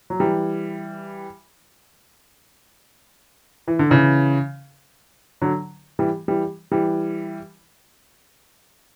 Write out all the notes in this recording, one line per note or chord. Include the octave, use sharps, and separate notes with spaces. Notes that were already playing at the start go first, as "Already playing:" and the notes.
F#3
E3 G3
E3
D3
C#3 E3
D3 F#3
E3 G3
E3 G3
E3 G3